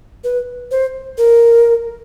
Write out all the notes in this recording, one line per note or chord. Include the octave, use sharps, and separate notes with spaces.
B4
C5
A#4